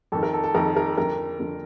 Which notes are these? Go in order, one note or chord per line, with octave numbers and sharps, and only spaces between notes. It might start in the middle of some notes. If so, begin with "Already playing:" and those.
F2 D#3 A4
A#4
A4
A4
F2 D#3 A#4
A#4
F2 D3 A#4
F2 D3